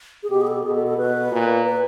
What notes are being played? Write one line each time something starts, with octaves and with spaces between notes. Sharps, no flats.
G#4
B2 G4
G#4
A4
B2 G#4
A4
A4
B2 B4
A#2
B4